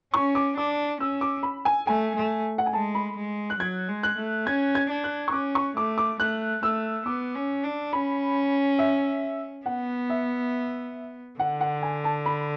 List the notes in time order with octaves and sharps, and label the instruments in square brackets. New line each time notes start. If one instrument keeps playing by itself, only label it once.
[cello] C#4 [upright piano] C#6
[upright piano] D6
[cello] D4 [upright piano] D6
[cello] C#4 [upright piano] E6
[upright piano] D6
B5
G#5
[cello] A3 [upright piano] G#5
[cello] A3
[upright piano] F#5
G#5
[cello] G#3 [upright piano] A5
[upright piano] B5
[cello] G#3
[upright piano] F#6
[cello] F#3 [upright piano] G#6
[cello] G#3
[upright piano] F#6
[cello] A3
[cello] C#4 [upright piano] G#6
[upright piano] G#6
[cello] D4
[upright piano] F#6
C#6
[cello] C#4 [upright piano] D6
[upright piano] C#6
[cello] A3 [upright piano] D6
[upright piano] D6
[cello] A3 [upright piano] F#6
[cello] A3 [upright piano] E6
[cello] B3 [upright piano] D6
[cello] C#4
D4
[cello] C#4 [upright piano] B5
[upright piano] E5
[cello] B3 [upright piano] F#5
[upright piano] E5
[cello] D3 [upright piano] F#5
[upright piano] F#5
G#5
A5
B5